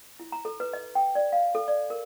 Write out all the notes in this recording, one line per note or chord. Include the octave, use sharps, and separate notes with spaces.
E4
A#5
A4
B4
D#5
G5
D5
F5
A4
D5
A#4